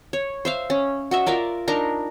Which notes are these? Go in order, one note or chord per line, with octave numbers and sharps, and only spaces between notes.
C#5
C5 E5 F5
C#4
F#4 D#5 E5
F4 A#4 D5 E5
D4 D#4 A#4 A#5